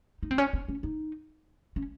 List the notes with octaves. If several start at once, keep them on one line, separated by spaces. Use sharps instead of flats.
D#4
C4
C#4
C4
C#4
D#4
C#4